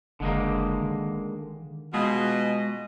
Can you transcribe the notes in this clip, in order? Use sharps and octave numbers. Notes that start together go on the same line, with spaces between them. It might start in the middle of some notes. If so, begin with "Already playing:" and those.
F#1 D3 G#3 A#3
D#3
B2 G#3 F4 G#4 D#5